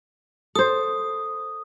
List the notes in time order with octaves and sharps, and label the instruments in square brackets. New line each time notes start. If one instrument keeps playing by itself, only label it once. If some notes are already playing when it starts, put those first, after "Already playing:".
[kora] A4 C5 [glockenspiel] D#6